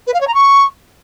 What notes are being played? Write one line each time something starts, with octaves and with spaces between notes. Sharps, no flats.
B4
F5
C#5
A#5
C#6